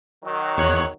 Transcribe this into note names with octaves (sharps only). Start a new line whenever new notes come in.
D#3 F#3
E2 C#5 F#6